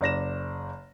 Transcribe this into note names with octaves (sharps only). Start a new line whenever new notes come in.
F#1 D5 A#6 E7